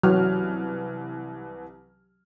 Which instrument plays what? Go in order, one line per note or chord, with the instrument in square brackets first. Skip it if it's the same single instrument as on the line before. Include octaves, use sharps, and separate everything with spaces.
[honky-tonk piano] C2 E3 F6 [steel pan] F#3